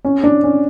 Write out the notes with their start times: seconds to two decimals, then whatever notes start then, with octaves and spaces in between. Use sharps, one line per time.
0.05 C#4
0.24 D4
0.44 C#4